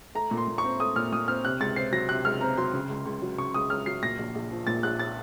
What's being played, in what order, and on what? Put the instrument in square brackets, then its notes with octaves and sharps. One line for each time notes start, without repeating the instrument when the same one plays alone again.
[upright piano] A3 [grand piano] A#5
[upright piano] A#2
[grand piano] C6
[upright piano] A#2
[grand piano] C#6
[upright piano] C4
[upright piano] A3 [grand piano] D#6
[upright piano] A#2 [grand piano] F6
[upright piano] A#2 [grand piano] D#6
[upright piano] C4 [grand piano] F6
[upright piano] C3 [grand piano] F#6
[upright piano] C#2 [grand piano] A6
[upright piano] C4 [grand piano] C7
[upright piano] F#3 [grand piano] A#6
[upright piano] C3 [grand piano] F#6
[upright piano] C#2 [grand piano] F6
[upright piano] C4 [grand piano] A#5
[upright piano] F#3 [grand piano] C6
[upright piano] C#3
C#2
C#2
F#3
[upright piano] C#3 [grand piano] C#6
[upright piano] C#2 [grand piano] D#6
[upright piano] C#2 [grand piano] F6
[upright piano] F#3 [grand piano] C7
[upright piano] A#2 [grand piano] A#6
[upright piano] A#1
A#1
F3
[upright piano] A#2 [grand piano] A6
[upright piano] A#1 [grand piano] F#6
[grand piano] A6